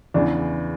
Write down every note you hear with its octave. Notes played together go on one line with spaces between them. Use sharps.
E2 C#3 E3 D4